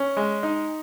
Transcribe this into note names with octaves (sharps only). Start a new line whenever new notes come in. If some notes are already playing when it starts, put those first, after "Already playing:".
Already playing: C#4
G#3
D#4